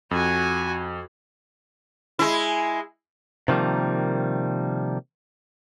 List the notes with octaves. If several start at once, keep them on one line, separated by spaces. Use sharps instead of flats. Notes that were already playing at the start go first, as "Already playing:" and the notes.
F2 F#4 G#5
G#3 E4
C3 D#3 F3 G3 A#3